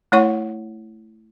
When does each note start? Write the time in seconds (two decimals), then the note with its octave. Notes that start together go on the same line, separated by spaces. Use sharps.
0.12 A3 E4 C#5 F#5 C#6